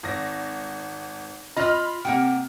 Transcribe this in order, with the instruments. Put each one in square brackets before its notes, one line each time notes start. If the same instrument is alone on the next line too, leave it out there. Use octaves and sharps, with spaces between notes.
[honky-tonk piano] G#1 A#6
[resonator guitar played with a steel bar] F4 D#5 [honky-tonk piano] B5 F6
[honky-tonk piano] C3 [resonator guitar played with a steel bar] A#3 F#5 G5